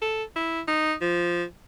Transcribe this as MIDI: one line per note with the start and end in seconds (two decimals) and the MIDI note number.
0.02 0.23 69
0.36 0.61 64
0.68 0.94 63
1.01 1.44 53